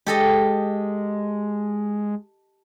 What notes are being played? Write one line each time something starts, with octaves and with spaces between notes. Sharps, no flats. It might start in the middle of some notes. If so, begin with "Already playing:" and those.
G#3 G4 A4 D#5